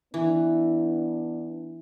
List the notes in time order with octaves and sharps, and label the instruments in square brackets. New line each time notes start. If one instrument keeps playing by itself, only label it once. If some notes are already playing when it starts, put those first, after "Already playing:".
[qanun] E3 [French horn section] B3 D4